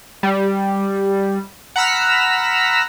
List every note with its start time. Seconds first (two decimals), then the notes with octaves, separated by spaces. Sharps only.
0.23 G3
1.76 F#5 A#5 B5 E6 F6 B6